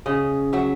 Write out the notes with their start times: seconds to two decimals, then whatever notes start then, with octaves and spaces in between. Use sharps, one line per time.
0.06 C#3 D#5
0.53 F#3 E5